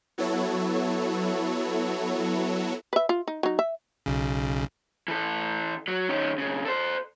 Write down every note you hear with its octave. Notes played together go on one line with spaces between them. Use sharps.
F#3 B3 E4 F#4 A4 C#5
B4 E5
F4
D#4
F#3 D#4
E5
B1 C#3
E3 A4
F#3
D#3 C#4
B1 C#3
A4 C5